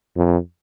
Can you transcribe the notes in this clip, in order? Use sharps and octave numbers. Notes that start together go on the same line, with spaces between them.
F2